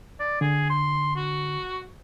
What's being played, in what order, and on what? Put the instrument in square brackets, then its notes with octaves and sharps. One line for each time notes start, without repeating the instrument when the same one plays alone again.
[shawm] D5
[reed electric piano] D3 [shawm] G#4
[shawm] C6
F#4